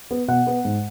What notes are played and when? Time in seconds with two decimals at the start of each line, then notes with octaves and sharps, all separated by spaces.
0.11 B3
0.28 B2 F#5
0.47 B3
0.65 G#2